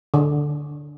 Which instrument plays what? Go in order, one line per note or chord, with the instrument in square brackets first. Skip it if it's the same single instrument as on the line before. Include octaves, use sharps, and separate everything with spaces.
[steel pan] D3